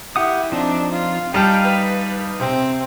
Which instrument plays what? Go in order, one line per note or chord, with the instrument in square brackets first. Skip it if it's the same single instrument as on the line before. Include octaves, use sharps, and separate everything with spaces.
[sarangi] E4 [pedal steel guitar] G4 F#5 D#6
[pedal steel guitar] F3 C4 D#4 [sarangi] D4
[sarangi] F4
[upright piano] G3 A5 [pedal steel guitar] D#4 F5 [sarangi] G5
[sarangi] B4
[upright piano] C3 [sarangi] C4